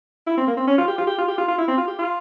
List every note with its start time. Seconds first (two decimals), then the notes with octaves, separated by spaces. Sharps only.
0.27 E4
0.37 C4
0.47 A#3
0.57 C4
0.67 C#4
0.78 F4
0.88 G4
0.98 F4
1.07 G4
1.18 F4
1.28 G4
1.38 F4
1.48 F4
1.58 E4
1.68 C4
1.77 F4
1.87 G4
1.98 F4